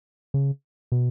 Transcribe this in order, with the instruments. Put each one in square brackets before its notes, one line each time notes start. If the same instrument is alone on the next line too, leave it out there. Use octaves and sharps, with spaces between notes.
[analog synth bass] C#3
B2